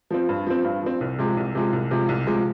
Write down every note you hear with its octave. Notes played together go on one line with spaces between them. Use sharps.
F3 C4
G2
F3 C4
G2
F3 C4
C2
C3 F3 G#3
C2
C3 F3 G#3
C2
C3 F3 G#3
C2
C3 F3 G#3